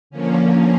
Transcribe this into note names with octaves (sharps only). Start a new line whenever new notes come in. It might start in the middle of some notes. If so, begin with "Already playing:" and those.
D3 F3 A#3 C#4